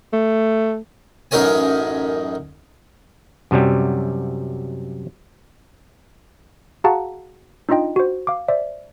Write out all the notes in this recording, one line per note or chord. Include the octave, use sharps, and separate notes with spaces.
A3
A1 F#2 D#4 A#4 C#5 G#5
F#2 C3 F#3 G3
F#4 G#4 F5 F#5 A5 A#5
D4 D#4 F4 D#5 G5
F#4 C5
F5 D6
C5 D5 E5